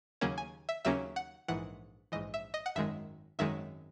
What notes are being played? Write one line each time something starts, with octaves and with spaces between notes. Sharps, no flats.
D#2 C#3 F#3 A#3 C#4
G#5
E5
D#2 C#3 F#3 A#3 C#4 E5
F#5
A#1 G#2 E3 F#5
A#1 G#2 E3 D#5
E5
D#5
F#5
G#1 F#2 D#3 G#3 E5
G#1 F#2 D#3 G#3 E5